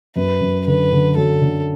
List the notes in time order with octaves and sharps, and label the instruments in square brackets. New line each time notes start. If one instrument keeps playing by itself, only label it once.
[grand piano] F#2 [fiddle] B4
[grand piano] F#2
[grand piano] D3 [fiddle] B4
[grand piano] D3
[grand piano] F#3 [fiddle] A4
[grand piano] D3